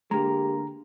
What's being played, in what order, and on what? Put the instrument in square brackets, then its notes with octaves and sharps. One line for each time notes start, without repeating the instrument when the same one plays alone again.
[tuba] D3 [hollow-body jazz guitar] G#3 A#3 [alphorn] G4 [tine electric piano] A#5